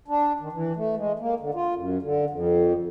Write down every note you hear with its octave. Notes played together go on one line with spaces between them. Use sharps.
D4
D#3
E3
A3
G#3
A#3
D3
F4
F#2
D3
F2